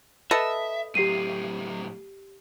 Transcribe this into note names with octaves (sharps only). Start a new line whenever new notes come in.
A4 B4 D#5 E5
A2 F#3 G4 C7 D#7